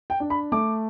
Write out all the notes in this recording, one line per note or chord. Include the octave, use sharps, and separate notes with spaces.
G5
D4
B5
A3 D6